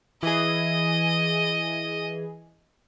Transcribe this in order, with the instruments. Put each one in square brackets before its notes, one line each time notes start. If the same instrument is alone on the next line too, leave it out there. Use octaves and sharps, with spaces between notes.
[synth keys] E3 G#4 [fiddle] D#5